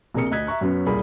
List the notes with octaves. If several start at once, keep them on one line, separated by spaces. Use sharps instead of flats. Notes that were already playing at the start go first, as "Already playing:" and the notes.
A#1 C3 G#4 A#4 D#6 C#7
D2 D#5 F#6 G#6 B6
E5 A#5 C#6 F#6
F#2 F#3 B3 C#4
D#1 C2 G#4 A#4 D5 B5